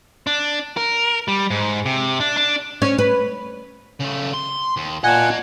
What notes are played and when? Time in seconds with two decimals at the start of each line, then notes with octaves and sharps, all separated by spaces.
0.27 D4
0.77 A#4
1.28 G3
1.50 G#2
1.86 C3
2.20 D4
2.37 D4
2.82 C#4
2.98 B4
4.00 C#3 A3
4.33 C6
4.77 D#2
5.04 A#2 D#5 F#5 G#5 A5